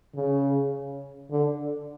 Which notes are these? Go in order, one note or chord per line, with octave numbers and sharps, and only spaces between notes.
C#3
D3